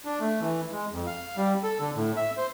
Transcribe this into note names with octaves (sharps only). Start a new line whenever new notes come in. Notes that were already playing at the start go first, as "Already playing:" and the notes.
D4
A3
E3
G#3
F2
F5
G3
A4
D3
A2
E5
C5